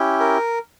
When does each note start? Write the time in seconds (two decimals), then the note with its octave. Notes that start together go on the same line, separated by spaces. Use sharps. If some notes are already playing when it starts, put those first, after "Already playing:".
Already playing: C#4 E4 G4
0.20 A#4